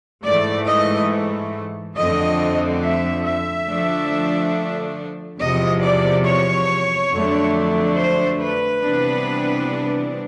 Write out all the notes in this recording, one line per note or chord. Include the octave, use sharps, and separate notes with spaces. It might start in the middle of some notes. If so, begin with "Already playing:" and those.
G#2 E3 A3 D5
D#5
F2 D3 F3 A3 C4 D#5
E5
E5
D3 F3 A3 D4
E2 C3 F3 D#5
D5
C#5
F2 D3 F#3 A3 D4
C5
B4
C3 E3 G3 B3 D4